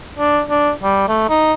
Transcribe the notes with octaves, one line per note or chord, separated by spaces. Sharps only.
D4
D4
G3
A3
D#4